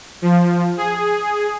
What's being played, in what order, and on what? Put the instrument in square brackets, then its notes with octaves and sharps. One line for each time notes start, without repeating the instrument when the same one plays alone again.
[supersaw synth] F3
G#4